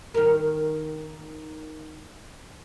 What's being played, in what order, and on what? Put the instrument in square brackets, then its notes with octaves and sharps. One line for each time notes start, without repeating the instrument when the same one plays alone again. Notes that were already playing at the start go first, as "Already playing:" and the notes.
[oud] D#3 A#4